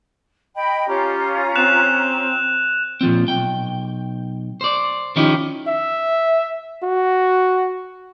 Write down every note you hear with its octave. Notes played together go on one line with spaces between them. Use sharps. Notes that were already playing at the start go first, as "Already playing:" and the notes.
D#5 G5 B5
C#4 F4 G4 A#5
C4 F#6 E7 F7
A#2 F3 C4
B1 G5
C5 D5
D#3 F3 C#4 D#4 E4 G4
E5
F#4